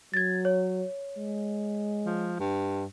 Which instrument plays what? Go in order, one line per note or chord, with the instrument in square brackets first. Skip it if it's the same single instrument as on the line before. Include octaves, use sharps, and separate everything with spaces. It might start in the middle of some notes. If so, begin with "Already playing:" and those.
[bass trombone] F#3 [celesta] G#6 A6
[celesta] C#5
[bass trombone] G#3
[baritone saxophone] F3
G2